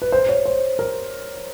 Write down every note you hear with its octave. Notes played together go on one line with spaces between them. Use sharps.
B4
C5
C#5
C5
A#4